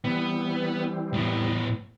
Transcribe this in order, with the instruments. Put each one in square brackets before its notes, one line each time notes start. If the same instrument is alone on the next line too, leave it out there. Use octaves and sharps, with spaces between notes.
[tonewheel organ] E3 G3 C4 [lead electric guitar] B3
[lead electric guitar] A2 B3